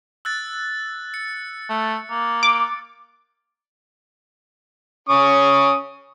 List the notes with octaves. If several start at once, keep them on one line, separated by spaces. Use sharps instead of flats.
E6 F#6 A6
C#7
A3
A#3
D6
C#4 C#6 D#6